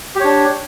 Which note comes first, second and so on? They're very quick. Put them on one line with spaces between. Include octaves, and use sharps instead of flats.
G4 C#5 D4